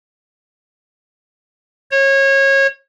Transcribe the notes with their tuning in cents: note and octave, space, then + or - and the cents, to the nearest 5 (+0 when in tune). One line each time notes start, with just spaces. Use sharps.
C#5 -25